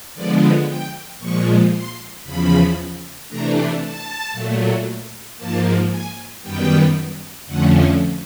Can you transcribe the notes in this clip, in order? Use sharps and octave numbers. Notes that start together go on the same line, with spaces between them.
D3 F3 G#3 B3 D5
G5
A#2 F3 G#3 C#6
C6
E2 C#3 F3 B5
C3 E3 A3 D4 A#5
A5
A#2 F#3 A3
G#2 F3 A#3 A5
G#5
F#2 D#3 G3 B3 G5
F2 D3 F3 A3 C#4 F#5